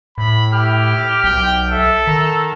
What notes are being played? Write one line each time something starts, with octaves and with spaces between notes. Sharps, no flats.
A2 B5
E4 G4 F6
B1 G5
A4 E5
D#3 A#5